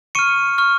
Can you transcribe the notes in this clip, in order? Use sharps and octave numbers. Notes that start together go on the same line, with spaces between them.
C#6 F6 C#7 D#7
C#6 F6